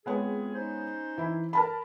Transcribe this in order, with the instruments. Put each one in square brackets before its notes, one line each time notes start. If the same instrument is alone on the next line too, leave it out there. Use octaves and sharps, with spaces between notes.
[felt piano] G#3 B3 C#5 [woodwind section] C4 F4 G#4
[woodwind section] C#4 D#4 C5
[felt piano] E3 E4
A#4 A5 B5